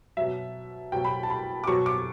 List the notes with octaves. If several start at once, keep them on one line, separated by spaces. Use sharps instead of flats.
B2 F#3 E5
B2 F#3 G5
B5
A5
B5
D6
B2 F#3 C#6
D6